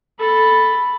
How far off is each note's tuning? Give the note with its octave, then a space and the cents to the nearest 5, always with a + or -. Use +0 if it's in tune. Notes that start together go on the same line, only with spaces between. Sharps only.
A4 +0 B5 +0